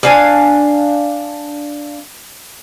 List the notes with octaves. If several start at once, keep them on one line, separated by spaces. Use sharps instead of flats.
D4 F5 G#5